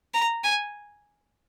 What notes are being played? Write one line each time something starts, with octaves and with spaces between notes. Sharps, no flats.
A#5
G#5